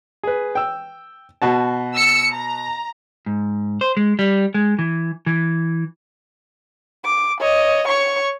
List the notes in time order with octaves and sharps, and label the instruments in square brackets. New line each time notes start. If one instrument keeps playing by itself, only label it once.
[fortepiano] G#4 B4
G5 E6
B2 F#4 A5
[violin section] E6 C#7
A#5
[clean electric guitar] G#2
C5
G#3
G3
G#3
E3
E3
[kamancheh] D6
C#5 D#5
C#5 C#6